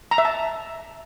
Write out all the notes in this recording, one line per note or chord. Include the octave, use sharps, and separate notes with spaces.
A#5
E5
A5